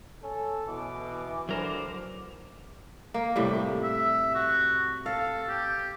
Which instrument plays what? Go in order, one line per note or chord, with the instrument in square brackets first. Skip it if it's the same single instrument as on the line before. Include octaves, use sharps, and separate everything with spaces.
[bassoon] C#4 [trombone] A4
[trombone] B2 [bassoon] E3 [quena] D6
[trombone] D3 [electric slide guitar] F#3 A#4 C5 [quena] D6
[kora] A#3
A2 C3 G3
[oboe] E5
F#4
[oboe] A4 [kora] F5
[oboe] G4